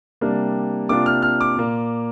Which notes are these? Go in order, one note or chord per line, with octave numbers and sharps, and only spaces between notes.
C3 G3 A#3 D4
C3 A#3 D4 F4 D6
F6
F6
D6
A#2 A#3 F4